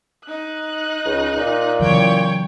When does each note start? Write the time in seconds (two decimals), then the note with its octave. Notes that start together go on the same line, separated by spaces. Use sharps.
0.24 D#4 F#6
1.06 C#2
1.37 A#2
1.80 C#3 E3 F#3 C#5 G5